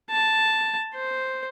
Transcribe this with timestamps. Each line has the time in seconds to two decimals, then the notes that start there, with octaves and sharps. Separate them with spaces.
0.10 A5
0.95 C5